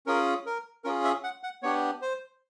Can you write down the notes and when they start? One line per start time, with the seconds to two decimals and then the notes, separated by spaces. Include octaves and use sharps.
0.06 C#4 F4 G#4 A#4
0.46 A#4
0.84 C#4 F4 G#4 A#4
1.04 E5
1.24 F#5
1.43 F#5
1.63 B3 D4 G4 C#5
2.02 C5